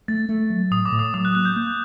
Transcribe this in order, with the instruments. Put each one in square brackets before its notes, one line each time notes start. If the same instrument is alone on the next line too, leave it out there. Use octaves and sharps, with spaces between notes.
[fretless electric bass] A3 [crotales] A6
[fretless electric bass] A3
F#3
[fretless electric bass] A2 [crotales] D#6
[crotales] D6
[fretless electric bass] A2
[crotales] D#6
[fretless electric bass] F#3 [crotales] D#6
[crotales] F#6
[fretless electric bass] A#3 [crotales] F#6
[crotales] G6
[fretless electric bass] A#3 [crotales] G6